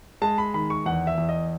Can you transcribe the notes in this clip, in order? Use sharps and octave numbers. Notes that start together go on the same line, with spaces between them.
G#3 A5
B5
D#3 B5
C#6
E2 F#5
E5
E2
D#5